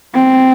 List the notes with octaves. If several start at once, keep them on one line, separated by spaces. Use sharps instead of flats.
C4